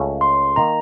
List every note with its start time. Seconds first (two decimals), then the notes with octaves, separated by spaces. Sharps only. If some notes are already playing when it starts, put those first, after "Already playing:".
Already playing: C#2 C#3 A3 C#4 A4
0.21 C6
0.56 D#3 A#3 A#5